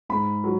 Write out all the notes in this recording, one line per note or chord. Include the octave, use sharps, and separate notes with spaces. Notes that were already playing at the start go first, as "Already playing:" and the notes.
G#2 B5
F#3